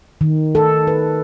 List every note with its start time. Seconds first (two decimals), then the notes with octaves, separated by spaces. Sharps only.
0.21 D#3
0.55 A4
0.87 B4